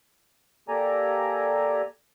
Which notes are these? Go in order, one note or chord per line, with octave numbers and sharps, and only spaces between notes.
A#3 G4 A4 D5 G#5 A#5